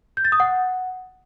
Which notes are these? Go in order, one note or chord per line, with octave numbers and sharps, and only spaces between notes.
G6
A6
D#6
F#5